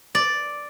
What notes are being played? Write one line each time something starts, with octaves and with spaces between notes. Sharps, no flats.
D5